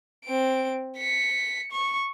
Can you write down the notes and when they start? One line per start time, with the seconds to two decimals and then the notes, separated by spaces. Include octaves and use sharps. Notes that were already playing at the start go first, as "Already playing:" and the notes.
0.25 C4 D7
0.97 B6 C#7
1.72 C#6